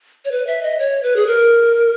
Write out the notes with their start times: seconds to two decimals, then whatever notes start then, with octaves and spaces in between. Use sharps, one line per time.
0.25 C#5
0.31 B4
0.47 E5
0.63 D#5
0.79 C#5
1.03 B4
1.16 G#4
1.27 A#4